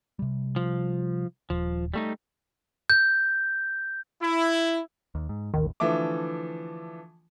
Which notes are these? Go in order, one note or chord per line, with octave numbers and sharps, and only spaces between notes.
C3 G3
F3
D#1 F3
G3 A3 D#4
G6
E4
D#2
G#2
A1 D#2 D#3
D3 E3 F3 A3 D6